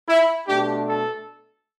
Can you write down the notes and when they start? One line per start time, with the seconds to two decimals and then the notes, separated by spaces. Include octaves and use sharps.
0.09 E4
0.48 B2 A3 D4 G4
0.87 A4